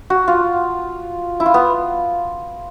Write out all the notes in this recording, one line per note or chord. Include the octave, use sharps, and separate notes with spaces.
F#4
F4
E4
F4
B3